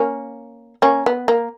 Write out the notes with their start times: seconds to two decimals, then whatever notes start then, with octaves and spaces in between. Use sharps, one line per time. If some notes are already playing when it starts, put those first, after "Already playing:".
Already playing: A#3 C#4
0.82 A#3 C#4
1.06 B3
1.28 A#3